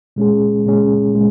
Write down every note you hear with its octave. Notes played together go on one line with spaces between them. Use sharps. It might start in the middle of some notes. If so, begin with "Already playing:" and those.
A#2 G#3 C#4 G#4
A#2 G#3 C#4 G#4
A#2 G#3